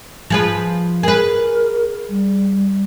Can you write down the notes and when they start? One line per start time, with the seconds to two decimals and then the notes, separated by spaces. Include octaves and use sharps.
0.30 F3 G#4 B4
1.03 G#4 A#4 B4
2.09 G3